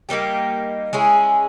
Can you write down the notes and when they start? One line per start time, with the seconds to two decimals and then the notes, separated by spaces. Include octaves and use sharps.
0.09 G3 A#3 D#4 G4
0.93 G#3 C#4 E4 G#4